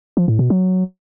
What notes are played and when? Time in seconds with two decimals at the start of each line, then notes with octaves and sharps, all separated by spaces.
0.17 F3
0.28 A2
0.39 B2
0.50 F#3